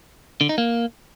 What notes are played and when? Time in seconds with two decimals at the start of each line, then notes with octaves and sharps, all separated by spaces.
0.41 D3
0.49 D#4
0.58 A#3